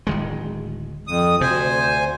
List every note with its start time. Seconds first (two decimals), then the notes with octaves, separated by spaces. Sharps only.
0.07 D1 D#3 G#3
1.08 F2 D#6
1.41 D2 C3 C5 G#5